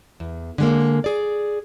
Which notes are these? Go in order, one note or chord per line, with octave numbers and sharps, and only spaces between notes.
E2
D3 G#3 A#3
G#4 D5